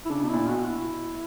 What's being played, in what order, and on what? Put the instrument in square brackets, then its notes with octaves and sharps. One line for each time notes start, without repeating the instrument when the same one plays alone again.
[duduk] E4
[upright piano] C#3 [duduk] D4
[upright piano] B2 [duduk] D4
[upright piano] A#2 [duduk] E4
[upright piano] B2 [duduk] F#4
[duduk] E4